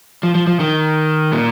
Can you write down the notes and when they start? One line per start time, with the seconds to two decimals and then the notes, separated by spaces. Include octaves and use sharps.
0.23 F3
0.35 F3
0.47 F3
0.60 D#3
1.33 A#2